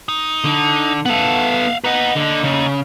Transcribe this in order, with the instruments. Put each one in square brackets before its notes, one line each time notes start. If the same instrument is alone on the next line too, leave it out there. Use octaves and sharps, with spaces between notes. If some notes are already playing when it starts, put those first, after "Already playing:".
[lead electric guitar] D#4
[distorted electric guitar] D3
[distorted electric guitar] B3 A4 [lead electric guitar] F5 F#5
[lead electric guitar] A#3 D#5 [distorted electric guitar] B4 F#5
[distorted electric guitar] D3
C#3